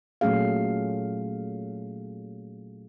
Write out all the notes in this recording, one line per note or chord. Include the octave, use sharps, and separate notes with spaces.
A#2 F#3 A3 C#4 G#4 F5